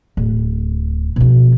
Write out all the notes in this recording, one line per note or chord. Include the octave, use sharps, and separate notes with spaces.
D1
B2 F3